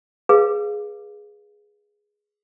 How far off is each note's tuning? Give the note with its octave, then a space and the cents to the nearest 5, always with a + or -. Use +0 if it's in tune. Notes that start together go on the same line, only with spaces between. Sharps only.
G#4 +0 B4 -20 F5 +0